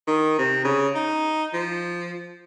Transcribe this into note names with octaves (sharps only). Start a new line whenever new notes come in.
D#3
C3
C#3
D#4
F3